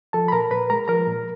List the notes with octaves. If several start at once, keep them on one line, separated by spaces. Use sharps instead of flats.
F3 A4 A5
B5
A#2 A#4 A#5
A#2 B4 B5
G#3 A#4 A#5
F3 A#4 A#5
A#2